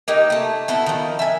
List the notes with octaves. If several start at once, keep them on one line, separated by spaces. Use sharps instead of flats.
A#3 D#4 G4
A3 A5
B3 E4 F#4 A4
D#3 F3
E5 G#5